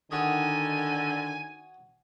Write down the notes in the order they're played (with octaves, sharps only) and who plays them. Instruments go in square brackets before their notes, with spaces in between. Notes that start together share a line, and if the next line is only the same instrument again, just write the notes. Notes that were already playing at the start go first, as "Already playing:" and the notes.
[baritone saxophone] D3 [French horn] D#3 [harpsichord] F#4 C#5 D#6 [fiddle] G#5